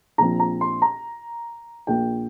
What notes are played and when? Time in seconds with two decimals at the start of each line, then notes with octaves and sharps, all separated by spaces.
0.18 A#1 A#2 F3 C4 A#5
0.40 A#5
0.61 C6
0.82 A#5
1.87 A#1 A#2 A#3 G5